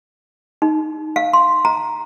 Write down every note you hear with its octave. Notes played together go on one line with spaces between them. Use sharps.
D#4
F5
C6
A#5